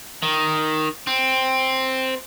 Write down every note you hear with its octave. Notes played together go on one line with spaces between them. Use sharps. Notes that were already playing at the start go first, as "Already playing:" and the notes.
D#3
C4